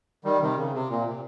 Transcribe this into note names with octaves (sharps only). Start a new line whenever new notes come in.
D#3 G3
C3 D#3
C#3
C3
A#2
C3